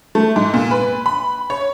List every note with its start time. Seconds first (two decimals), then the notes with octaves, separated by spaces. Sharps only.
0.15 A3
0.36 G#2
0.54 A#2
0.71 B4
1.06 B5
1.50 C#5